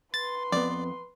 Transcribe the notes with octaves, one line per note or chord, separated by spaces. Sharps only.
B4 C6 A6
F2 B3 D5